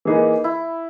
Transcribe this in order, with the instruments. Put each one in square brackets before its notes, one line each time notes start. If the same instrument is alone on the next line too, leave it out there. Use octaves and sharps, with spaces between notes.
[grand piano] E3 A#3 D#4 G#4 B4
[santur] E4